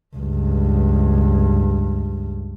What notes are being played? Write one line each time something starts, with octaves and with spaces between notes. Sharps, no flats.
C#2 G2